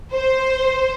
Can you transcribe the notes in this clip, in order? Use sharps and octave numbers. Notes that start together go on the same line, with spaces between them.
C5